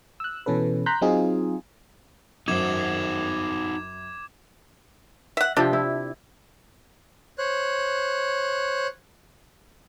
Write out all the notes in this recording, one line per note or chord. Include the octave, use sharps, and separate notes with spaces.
E6 F#6
B2 E3 C#4 A4 B4
A#5 C6 F#6 G6 B6
F#3 C4 D#4 F4 G#4
F#2 D#4 F#4 C5 D6 G#6 E7
E5 F#5
C3 F3 D4 G4
E4
C5 C#5 F#6